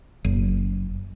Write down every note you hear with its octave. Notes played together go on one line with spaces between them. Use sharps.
F#1